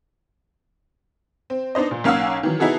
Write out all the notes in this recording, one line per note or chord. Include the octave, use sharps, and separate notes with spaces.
C4
B3 D4 D#4 C5 D#5
A#2
B1 A#3 C#4 F5 F#5 E6
D#3 E3 F#3
B3 D#4 E4 F#4 G#4 A4